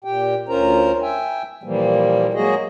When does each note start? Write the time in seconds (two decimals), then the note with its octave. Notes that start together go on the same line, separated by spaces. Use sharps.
0.04 A#2 G4 G5
0.49 D2 C#4 F4 A#4 C5 A#5
1.02 E5 G5 G#5
1.63 A#2 E3 F3 G3 A#3
2.34 F#3 G#3 A#3 F#4 G#4 D#5